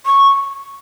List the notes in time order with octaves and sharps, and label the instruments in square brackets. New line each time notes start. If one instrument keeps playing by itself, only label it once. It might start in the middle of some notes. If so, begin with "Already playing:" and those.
[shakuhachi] C#6